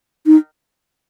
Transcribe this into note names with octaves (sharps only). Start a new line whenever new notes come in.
D#4